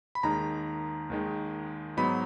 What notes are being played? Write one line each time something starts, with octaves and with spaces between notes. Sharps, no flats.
B5
D#2 D#3 G#3 D#4 A#5
D#2 D#3 G#3 D#4
G#2 F#3 B3 D#4 B5